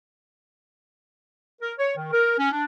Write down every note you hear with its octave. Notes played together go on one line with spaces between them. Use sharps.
A#4
C#5
D#3
A#4
C#4
D4